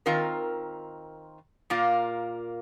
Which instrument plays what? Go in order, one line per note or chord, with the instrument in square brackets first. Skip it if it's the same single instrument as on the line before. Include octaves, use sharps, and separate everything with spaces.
[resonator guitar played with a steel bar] D#3 C4 F4 A#4
A#2 A#3 F4 A#4